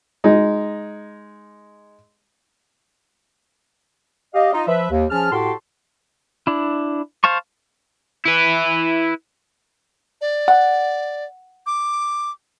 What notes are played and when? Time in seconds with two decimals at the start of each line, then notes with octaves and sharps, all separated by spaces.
0.24 G#3 D#4
4.34 G4 D#5 F5
4.52 D#4 F4 D#5
4.66 F3 B4 E5
4.90 D#2
5.10 F3 C#4 G#4 A5 F6
5.31 A2 F#4 G4 A4 A5 C6
6.47 D4 E4
7.24 C5 F5 A5 C#6
8.26 E4 B4
10.21 D5
10.48 F#5
11.66 D6